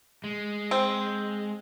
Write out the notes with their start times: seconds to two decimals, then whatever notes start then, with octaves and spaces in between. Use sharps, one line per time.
0.24 G#3
0.71 C4